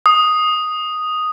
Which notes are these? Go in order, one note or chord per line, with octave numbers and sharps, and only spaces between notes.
D#6